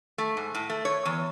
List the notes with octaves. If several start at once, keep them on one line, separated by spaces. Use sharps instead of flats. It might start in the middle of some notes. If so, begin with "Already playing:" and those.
A3
G#2
A2
A3
C#5
E2